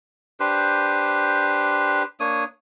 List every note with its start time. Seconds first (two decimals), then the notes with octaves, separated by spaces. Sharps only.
0.40 D4 G4 B4 C5
2.20 A#3 D4 C#5 D#6